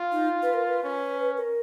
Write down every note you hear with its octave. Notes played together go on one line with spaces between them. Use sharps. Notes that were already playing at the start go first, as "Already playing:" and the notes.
Already playing: F4
D#4
B4
A#4
B4
C#4
A#4